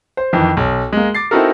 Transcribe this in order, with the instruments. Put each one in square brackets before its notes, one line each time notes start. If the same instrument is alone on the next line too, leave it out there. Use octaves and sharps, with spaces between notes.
[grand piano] C5
F2 D#3 E3
B1
G#3 A#3
D6 A6 C7
C4 D#4 E4 F#4 A4 A#4